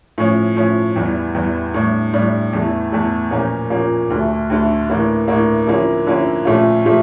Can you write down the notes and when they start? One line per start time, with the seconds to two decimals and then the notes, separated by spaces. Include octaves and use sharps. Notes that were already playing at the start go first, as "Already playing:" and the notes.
0.18 A2 F3 C#4
0.57 A2 F3 C#4
0.96 E2 E3 G3
1.35 E2 E3 G3
1.74 A2 G3 D4
2.13 A2 G3 D4
2.53 E2 E3 A3
2.92 E2 E3 A3
3.31 A#2 F3 A#3 C#4
3.70 A#2 F3 A#3 C#4
4.10 D2 D3 A3
4.50 D2 D3 A3
4.89 A2 E3 A#3 D4
5.27 A2 E3 A#3 D4
5.67 D3 F3 A#3 C#4 E4
6.06 D3 F3 A#3 C#4 E4
6.45 A#2 F3 A3 C#4 F4
6.85 A#2 F3 A3